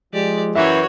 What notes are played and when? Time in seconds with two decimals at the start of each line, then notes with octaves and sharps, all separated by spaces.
0.14 F3 G#3 G4 D5
0.55 F#2 E3 F#4 C#5 E5